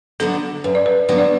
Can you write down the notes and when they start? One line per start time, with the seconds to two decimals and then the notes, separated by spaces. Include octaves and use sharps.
0.20 D3 F#3 B3 D4 A4
0.64 F#2 B4
0.75 D5
0.86 B4
1.09 D3 F#3 B3 D4 B4
1.18 D5